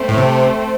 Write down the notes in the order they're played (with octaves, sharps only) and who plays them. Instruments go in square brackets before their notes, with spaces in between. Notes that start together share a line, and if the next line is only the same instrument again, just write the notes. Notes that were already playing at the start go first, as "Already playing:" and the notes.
Already playing: [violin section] A3 C4 A4 C5
[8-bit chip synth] A2
C3